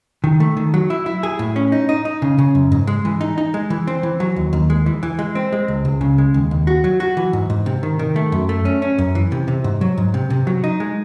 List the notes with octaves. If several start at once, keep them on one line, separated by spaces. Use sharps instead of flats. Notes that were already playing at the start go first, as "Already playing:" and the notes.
D#3
A3
D#3
F#3
E4
E4
G#4
A2
C#4
D#4
D#4
D#4
C#3
C#3
F#2
G#2
G#3
E3
D#4
D#4
G#3
E3
C4
E3
F#3
D#2
D#2
G#3
E3
E3
G#3
C4
G#3
C#2
C#2
C#3
G#3
D#2
D#2
F#4
F#3
F#4
E3
G#2
G#2
C3
D#3
D#3
A3
F#2
A3
C#4
C#4
F#2
E3
C3
C3
G#2
F#3
G#2
C3
C3
F#3
D#4
G#3